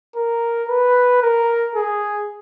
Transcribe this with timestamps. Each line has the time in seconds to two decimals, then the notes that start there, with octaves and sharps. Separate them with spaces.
0.16 A#4
0.69 B4
1.22 A#4
1.75 G#4